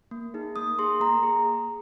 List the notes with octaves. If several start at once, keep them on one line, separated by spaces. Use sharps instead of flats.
A#3
D#4 G#4
A#3 D#6
G#4 C6
A#3 A#5
G#4